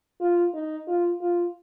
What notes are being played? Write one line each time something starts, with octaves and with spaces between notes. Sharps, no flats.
F4
D#4
F4
F4